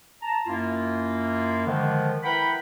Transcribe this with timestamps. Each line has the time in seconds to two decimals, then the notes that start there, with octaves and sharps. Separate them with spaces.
0.22 A5 A#5
0.47 F#2 A#3 E4 F4
1.67 D3 D#3 F3 G#3
2.23 E4 A#4 B4 F#5 G5 B5